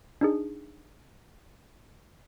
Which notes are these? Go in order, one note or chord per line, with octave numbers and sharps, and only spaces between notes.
D4 D#4 G#4